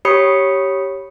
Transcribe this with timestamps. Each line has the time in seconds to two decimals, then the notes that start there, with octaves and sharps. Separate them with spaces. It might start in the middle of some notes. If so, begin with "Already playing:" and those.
0.05 G4 C#5 B5 D#6 C#7